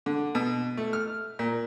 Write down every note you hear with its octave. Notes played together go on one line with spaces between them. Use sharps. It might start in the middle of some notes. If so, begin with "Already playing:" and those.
D3
B2
A3
F6
A#2